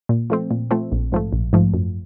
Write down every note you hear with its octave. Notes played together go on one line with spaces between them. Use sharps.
A#2
F3 A3 C4
A#2
F3 A3 C4
A#1
G#2 F3 A3
A#1
G#2 F3 A3
F#2